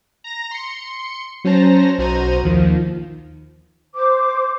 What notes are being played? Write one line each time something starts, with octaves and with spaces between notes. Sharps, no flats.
A#5 A#6
C6 C#7
F#3 C#4 C5 A5 A#5 A#6
B1 F#4 C5 A#5 D#7
D#2 D#3 F3
C5 D6